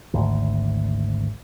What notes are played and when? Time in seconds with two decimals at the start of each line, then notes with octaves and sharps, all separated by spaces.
0.14 G#1 D2